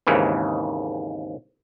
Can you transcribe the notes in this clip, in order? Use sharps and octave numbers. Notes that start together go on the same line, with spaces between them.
G#1 D#2 G#2 C#3 E3